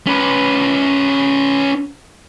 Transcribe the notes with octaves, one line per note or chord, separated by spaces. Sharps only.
C#4 B4